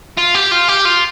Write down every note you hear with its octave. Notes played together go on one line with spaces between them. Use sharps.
F4
G4
F4
G4
F4